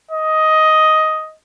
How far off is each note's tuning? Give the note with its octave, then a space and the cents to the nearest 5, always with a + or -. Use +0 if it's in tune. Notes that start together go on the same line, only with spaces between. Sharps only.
D#5 +10